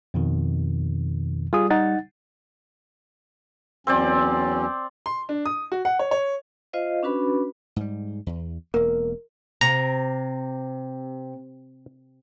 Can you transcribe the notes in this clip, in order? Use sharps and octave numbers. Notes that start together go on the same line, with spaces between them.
F2 B2 D#3
G3 F4 G#4 D#6
D#4 F#5 A6
E2 F#3 C4 C#4 C5 D5
C6
D4
D#6
F#4
F#5
C#5
C#5
F4 C5 D#5 F5
C#4 D4 F#4 B4 B5
G#2 G3
E2
E1 A#3 A#4
C3 A#5